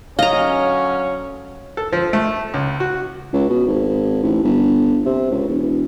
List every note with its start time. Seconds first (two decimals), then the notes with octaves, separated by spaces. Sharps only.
0.19 D3 F#3 C#4 D#5 F5 A#5
1.77 A4
1.93 F3
2.13 A3
2.54 C#2
2.80 F#4
3.33 C#2
3.49 B2
3.67 G#1
4.23 A1
4.44 G1
5.05 C3
5.31 C#2
5.49 E1